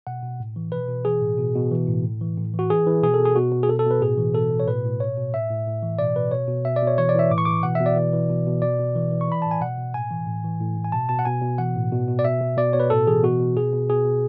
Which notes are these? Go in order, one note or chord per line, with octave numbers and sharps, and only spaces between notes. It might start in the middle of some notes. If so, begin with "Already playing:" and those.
B2 F#5
B2
A2
E3
B2 B4
B2
E3 G#4
A2
B2
B2
E3
A2
A2
E3
A2
E3 F#4
E3 G#4
E3
B2 G#4
A4
B2
G#4
B2 F#4
B2
G#4
B2 A4
A4
B2 B4
A2 G#4
E3
B2 A4
B2
C#5
A2 B4
A2
B2 C#5
B2
A2 E5
A2
A2
E3
B2 D5
B2 B4
B2 C#5
B2
B2 E5
D5
B2
C#5
E3 C#5
D5
E3 E5
A2 D6
C#6
E3 D6
B2 F#5
E5
B2
D5
E3
E3
B2
B2
B2 D5
B2
E3
E3
C#6
E3 B5
A2 A5
G#5
B2 F#5
B2
A2 G#5
E3
A2
E3
A2
A2
G#5
B2 A5
B2 A5
F#5
B2 G#5
B2
E3 F#5
A2
B2
B2
D5
B2 E5
B2
B2 D5
B2 C#5
B4
A2 A4
E3 G#4
B2 F#4
B2
B2 G#4
B2
B2 G#4
B2